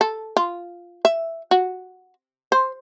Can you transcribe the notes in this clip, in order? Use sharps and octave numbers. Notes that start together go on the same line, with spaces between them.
A4
F4
E5
F#4
C5